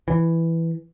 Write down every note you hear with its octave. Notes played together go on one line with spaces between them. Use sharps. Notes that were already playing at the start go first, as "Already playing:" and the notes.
E3